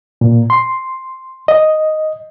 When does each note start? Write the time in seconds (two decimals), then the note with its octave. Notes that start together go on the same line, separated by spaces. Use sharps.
0.21 A#2
0.50 C6
1.48 D#5